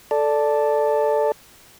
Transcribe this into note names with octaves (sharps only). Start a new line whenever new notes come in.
A4 D5